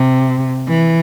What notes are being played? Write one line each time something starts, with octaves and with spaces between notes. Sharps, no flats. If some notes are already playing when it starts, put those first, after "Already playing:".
Already playing: C3
E3